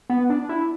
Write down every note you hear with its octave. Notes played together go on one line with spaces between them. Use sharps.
B3
D4
E4